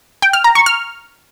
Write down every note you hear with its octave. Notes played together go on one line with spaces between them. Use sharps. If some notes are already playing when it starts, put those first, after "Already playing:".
G5
F6
A#5
C#6
F6